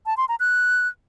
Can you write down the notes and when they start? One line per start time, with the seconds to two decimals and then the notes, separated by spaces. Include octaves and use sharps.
0.06 A5
0.17 C6
0.29 A#5
0.40 F#6